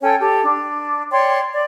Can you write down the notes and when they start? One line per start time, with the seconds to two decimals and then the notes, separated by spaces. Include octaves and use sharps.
0.01 C#4 A4 C#5 G5
0.19 G4 A4
0.43 D4
1.11 C#5 D5 G5 C6
1.52 D5